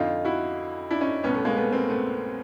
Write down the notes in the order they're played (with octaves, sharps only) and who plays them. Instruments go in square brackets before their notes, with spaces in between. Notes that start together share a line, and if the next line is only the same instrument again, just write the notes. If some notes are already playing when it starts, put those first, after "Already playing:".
Already playing: [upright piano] F2 D3 D#4 F4
E4 F#4
D4 E4
C#4 D#4
C2 B2 B3 C#4
A3 B3
G#3 A#3
A3 B3
A#3 C4
A3 B3